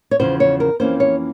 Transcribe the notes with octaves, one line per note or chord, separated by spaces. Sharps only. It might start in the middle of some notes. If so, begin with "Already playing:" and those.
C#5
E2 C#3 F3 C5
C#5
A#4
F2 E3 A#3 C#4 C5
C#5